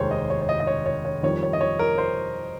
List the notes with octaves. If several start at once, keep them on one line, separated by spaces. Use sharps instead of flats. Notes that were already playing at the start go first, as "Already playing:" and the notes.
Already playing: F1 D#2 D#3 G#3 C5 C#5
D#5
C#5
C#5
D#5
D#5
C#5
C#5
C#5
F2 D#3 G3 C#5
C#5
D#5
C#5
A#4
C5